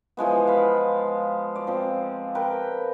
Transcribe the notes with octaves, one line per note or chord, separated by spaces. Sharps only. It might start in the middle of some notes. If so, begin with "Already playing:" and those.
E3 F3 G#3 B3
F5 B5
D5
F3 C4
A#4 B4 G5